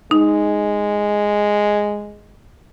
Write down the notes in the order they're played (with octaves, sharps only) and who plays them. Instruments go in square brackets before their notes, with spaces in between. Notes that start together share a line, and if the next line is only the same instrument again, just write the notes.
[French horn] G#3 [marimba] D#4